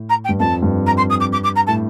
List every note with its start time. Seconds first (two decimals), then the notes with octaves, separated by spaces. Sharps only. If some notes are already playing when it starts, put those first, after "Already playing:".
Already playing: A2
0.09 A#5
0.24 G5
0.29 G2
0.39 F2 A5
0.62 G2
0.86 A#5
0.97 C6
1.09 D#6
1.20 D6
1.32 D6
1.43 D6
1.55 A#5
1.66 A2 A5